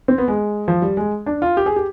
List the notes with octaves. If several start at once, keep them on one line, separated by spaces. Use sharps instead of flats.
C4
B3
G#3
F3
G3
G#3
D4
F4
G4
G#4
G4